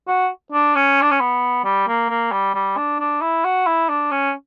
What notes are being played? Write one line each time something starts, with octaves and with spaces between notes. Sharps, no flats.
F#4
D4
C#4
D4
C#4
B3
G3
A#3
A#3
G3
G3
D4
D4
E4
F#4
E4
D4
C#4